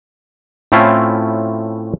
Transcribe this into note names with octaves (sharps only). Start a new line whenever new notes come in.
A2 A3 C4 C#4 E4 F4